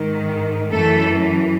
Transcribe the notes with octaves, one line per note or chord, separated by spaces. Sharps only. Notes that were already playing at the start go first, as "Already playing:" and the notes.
Already playing: G#2 D#3
F#2 E3 A3 A4